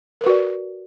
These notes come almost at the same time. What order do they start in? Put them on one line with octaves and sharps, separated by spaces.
A#4 B4 F#4 D5